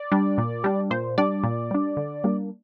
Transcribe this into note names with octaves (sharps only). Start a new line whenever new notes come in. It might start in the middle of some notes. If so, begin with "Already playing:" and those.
Already playing: D5
G3 D4
A#2
G3 D4
A#2 C5
G3 D4 D5
A#2
G3 D4
D3
G3 A#3 D4